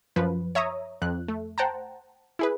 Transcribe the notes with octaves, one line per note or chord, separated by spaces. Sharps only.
F#2 F3 B4
C#5 E5 A#5 D#6
F2 F#6
A3
C5 F#5 G5 A5 A#5
E4 G#4 B4